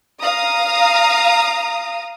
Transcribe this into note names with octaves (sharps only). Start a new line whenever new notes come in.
F5 A#5 D#6